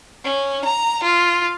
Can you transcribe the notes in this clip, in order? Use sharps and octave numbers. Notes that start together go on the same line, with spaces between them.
C#4
A#5
F4